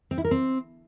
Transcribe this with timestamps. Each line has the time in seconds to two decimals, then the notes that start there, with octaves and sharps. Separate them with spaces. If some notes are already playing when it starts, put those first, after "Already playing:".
0.11 C4
0.18 E4
0.24 A#4
0.31 C4